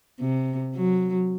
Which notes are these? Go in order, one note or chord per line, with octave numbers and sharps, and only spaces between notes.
C3
F#3